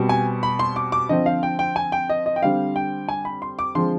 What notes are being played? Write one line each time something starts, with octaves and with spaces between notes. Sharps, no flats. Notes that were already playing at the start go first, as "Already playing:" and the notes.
Already playing: B2 G3 C4
G#5
B5
C6
D6
D6
D3 F3 C4 D#5
F5
G5
G5
G#5
G5
D#5
D#5
G5
D3 G3 C4 F5
G5
G#5
B5
C6
D6
D3 F3 G#3 C4 C6